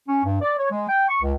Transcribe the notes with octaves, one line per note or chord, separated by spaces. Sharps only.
C#4
G2
D5
C#5
G#3
G5
C#6
C#2